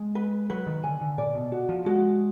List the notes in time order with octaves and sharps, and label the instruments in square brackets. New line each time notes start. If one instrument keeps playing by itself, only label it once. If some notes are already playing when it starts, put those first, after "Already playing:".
Already playing: [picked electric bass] G#3
[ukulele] B4
[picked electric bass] F#3 [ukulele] B4
[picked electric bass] D#3
[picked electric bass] D3 [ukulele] G#5
[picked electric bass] D3
[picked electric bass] A#2 [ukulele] D5
[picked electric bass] B2
[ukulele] F#4
[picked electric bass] F3
[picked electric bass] G#3 [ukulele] F#4